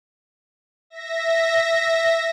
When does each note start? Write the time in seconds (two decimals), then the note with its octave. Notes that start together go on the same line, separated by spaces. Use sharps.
0.90 E5 A#6